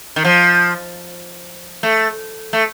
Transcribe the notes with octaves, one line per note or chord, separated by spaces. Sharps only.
D#3
F3
A3
A3